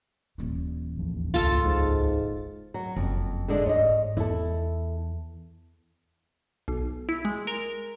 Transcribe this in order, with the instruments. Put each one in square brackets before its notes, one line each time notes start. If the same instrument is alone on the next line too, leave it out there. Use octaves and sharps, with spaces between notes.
[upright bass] D#1 E3
[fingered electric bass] E1 A1 F3
[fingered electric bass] G#1 C#2 [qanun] F4 A4
[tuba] G#2
[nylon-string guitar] F#3
[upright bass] F#1 [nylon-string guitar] F2
[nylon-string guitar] D3 G#3 D4
[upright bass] G#2 [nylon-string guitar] C#5 D#5
[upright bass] E2 [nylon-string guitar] E4 A4
[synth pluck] B1
E4
G#3
A#4